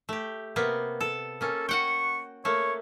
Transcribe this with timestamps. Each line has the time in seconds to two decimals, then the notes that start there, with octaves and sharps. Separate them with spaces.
0.09 A3 G4
0.56 C3 A#3 B3
1.01 A4
1.41 A#3 C#4 A4
1.69 F#4 F#5 G5 C#6
2.45 A3 A#3 C#5